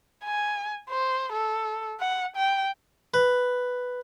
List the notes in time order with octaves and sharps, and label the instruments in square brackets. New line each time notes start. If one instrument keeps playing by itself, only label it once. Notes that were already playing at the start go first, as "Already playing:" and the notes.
[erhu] G#5
C5
A4
F#5
G5
[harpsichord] B4